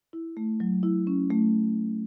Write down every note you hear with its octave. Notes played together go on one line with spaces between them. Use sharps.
E4
A3
F#3
E4
C#4
A3